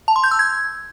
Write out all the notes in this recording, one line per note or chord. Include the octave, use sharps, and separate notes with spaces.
A5
C6
G6
E6
G#6